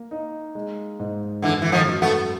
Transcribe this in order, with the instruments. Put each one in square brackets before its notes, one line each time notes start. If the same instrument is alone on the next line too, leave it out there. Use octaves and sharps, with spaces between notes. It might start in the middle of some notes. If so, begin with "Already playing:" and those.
Already playing: [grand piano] A#3
D#4
G#3
G#2
[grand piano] F#2 [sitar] D3 E3
[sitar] E3
D#3 F3
[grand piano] F#3
[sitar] A3 B3